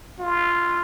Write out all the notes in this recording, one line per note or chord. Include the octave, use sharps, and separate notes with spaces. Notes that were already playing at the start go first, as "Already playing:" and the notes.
F4